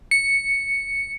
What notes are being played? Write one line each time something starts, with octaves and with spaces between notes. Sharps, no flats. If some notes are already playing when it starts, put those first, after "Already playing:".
C#7